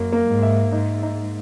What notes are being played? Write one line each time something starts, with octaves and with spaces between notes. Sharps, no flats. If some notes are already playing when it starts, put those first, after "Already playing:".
Already playing: F#2 A#3
A#3
G#2
E5
G#2 D#4
D#4